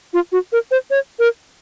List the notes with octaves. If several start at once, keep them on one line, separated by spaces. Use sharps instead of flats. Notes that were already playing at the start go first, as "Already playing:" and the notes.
F4
F#4
A#4
C5
C#5
A#4